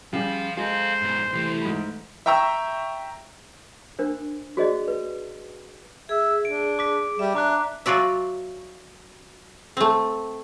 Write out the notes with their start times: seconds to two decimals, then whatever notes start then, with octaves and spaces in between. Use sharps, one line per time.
0.13 C#3 F3 G3 F5
0.57 G#3 A4 C5 F5
1.02 G#2 B3
1.33 C2 E3 A3 G4
1.62 G#2 B5
2.26 E5 G5 A#5 C#6 E6
3.99 D4 A#4 C5
4.57 F#4 G#4 C5 D5 D#5
4.88 B4
6.09 G#4 E5
6.45 D4 D7
6.79 D6 B6
7.19 G3 E5
7.35 D4 A#5 D6 F#6
7.86 F#3 F4 F#4 D5 E5
9.77 A3 C4